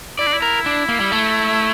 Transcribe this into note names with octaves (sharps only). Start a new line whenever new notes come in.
E4 D5
D4
E4
A#4
D4
A#3
G3
A3